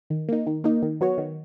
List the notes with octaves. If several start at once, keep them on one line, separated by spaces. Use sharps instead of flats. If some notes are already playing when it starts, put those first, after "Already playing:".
D#3
A#3 D#4
D#3
A#3 D#4
D#3
F#3 B3 F#4 C#5
D#3